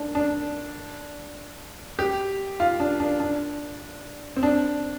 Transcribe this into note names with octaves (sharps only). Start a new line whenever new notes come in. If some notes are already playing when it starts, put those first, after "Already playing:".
Already playing: D4
D4
G4
F4
D4
D4
D4
C4
D4